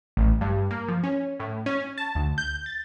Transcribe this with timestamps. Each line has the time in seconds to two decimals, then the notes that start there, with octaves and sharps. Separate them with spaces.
0.17 A1
0.41 G2
0.71 A#3
0.88 F3
1.03 C#4
1.40 A2
1.66 C#4
1.98 A5
2.15 D2
2.38 G6
2.66 A6